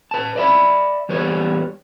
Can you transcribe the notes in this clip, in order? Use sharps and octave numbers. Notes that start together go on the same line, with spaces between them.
B4 A5
D5 E5 B5
E2 G3 B4 C#5